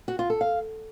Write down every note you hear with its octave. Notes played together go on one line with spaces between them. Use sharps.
F#4
F4
A4
F5